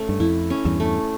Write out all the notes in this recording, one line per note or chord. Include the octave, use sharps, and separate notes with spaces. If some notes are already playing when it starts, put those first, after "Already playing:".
Already playing: A3 C#4
G2
F2 E4
C#4
E2 G2
A3